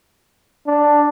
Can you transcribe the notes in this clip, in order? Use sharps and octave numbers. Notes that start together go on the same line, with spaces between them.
D4